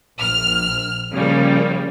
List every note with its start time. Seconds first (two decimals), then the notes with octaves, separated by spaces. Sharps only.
0.19 A#1 F6
1.14 C#3 F3 G3 A#3